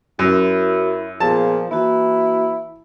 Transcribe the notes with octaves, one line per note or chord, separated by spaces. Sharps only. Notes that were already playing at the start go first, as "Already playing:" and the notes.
F#2 E4 F#4 A#4 C#5
A#2 F3 B3 G#4 A5
E3 A#3 E4 F#4